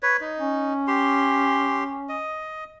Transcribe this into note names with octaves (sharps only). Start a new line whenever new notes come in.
B4 C#5
D#4
C#4
G4 C6
D#5